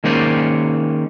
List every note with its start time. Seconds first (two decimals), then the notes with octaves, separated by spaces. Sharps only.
0.04 D#3 G#3 A#3 C#4 C5 D5